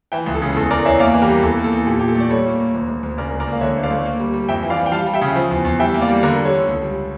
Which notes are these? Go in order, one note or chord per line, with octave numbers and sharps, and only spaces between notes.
E3 E5 G5
C#2
A4
C#3
E2 A4
E2 A#4 D5
E2 C#5 E5
A#3 D5 F5
E3
G4 A#4
G3
E2 A4
A#3
A4
E2
A#2 G4
A#2 G4
A4
A3 D5
G3 A4 C#5
A#3
A#3
D2
D2
D2
C#3 A#4 D5
C#2
A#4 D5
A#3 F5
D3 C#5 E5
D2
D5 F5
A3
A#3
G3
G3
F2 E5 G5
E3
D5 F5
E3
G5
G3 F5 A5
G3
E5 G5
C#3
F3
E2
E2
G3 E5 G5
A#3
D5 F5
G3
D3 A#4 D5
G3
A4 C#5
D3
C#2
G3